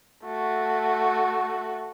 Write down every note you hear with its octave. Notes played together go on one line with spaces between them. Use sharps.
A3 F#4